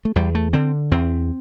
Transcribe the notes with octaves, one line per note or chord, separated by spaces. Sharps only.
A3
E2 G3
A3
D3 C4
E2 C4